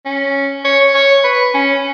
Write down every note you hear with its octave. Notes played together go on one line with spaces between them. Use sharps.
C#4
C#5
C#5
B4
C#4